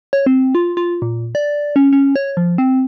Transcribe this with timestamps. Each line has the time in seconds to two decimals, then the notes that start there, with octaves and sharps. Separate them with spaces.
0.13 C#5
0.26 C4
0.55 F4
0.77 F4
1.02 A#2
1.35 D5
1.76 C#4
1.93 C#4
2.16 C#5
2.37 F3
2.58 C4